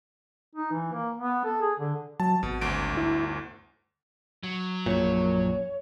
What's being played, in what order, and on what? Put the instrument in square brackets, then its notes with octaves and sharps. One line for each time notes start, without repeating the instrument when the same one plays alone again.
[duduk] D#4
E3
A#3
B3
A4
G#4
D3
[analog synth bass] F#3 [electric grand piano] A5
[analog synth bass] G#1 [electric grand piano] B2
[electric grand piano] G1 D2 D7
[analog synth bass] E4
[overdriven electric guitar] F#3
[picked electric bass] A#1 F#2 A#2 [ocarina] C#5